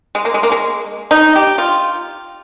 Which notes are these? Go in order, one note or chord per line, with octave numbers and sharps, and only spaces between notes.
G#3
A#3
G#3
A#3
G#3
D#4
G4
F4